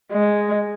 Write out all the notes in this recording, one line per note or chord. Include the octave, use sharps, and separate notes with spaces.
G#3